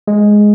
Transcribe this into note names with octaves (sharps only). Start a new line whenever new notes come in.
G#3